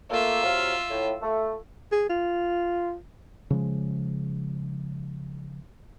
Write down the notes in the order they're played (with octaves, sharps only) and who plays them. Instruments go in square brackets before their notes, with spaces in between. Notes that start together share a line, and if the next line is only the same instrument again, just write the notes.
[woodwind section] A3 A#3 [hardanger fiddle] F4 E5
[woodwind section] C3 F#3 F5
A2
A3
[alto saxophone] G#4
F4
[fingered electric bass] C#3 F3 G#3